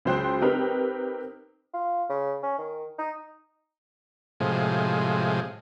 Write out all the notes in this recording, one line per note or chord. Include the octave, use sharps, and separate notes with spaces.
C#2 F#3 C5 G5 F#6
C4 D#4 G4 A#4 B4
F4
C#3
C#4
D#3
D#4
A2 C3 F3 G#3